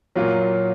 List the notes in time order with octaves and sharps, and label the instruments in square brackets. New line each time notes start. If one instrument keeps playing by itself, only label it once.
[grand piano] A#2 F#3 A#3 F4